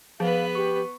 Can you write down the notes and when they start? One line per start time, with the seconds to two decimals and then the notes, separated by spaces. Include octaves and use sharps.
0.20 F3 B3 G#4 B4 F5
0.55 G4 C#6